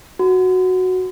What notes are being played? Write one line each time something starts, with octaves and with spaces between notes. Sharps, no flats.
F#4